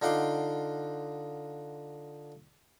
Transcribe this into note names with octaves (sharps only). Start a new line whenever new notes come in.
D3 D#4 F4 F#5 C6 D6